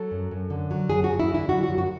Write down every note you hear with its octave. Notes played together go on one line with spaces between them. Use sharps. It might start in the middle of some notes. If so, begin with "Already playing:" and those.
Already playing: F#3 A4
F#2
F#2
D3
F#3
F#2 G#4
F#4
F#2
E4
D3 E4
F#3 F#4
F#2 F#4
F#4